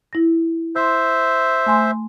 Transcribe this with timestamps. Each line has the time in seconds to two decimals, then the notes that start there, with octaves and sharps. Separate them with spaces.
0.13 E4 A#6
0.76 C5 E5 C6 E6
1.66 A3 G#5 C6